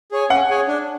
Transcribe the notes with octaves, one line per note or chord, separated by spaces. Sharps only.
G#4 C#5 G#5
C#4 F#5
G#4 C#5 G#5
D4